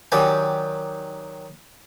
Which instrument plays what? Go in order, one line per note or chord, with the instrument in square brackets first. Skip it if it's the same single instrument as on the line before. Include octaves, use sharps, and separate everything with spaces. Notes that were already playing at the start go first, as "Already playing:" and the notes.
[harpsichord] D#3 F#3 G4 D5 G5 G#5